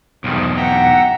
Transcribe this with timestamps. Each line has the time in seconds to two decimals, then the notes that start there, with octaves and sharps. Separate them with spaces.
0.24 B1 E2 G2 D#3 F3
0.56 E5 F#5 G5 A#5